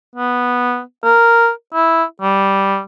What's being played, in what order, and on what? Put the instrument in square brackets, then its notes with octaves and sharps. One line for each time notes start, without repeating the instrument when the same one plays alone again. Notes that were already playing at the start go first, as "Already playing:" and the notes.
[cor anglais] B3
A#4
E4
G3